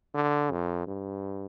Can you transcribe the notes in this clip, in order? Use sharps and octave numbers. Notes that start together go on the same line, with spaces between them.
D3
F2
G2